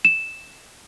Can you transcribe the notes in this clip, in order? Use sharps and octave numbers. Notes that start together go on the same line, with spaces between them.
E7